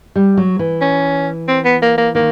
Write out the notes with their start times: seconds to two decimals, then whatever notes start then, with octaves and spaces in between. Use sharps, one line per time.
0.16 G3
0.37 F#3
0.59 E3
0.82 C#4
1.48 C4
1.65 B3
1.82 A#3
1.98 A#3
2.15 D#3 A#3